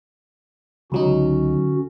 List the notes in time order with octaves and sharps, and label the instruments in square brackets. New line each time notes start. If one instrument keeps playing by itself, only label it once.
[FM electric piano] C#2 F#3 D#4 [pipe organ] D3 C#4 F#4